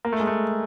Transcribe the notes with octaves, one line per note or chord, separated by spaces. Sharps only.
A#3
A3
G#3
A3